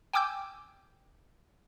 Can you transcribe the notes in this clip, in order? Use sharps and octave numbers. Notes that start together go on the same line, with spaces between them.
G5 G#5 D6 E6 G6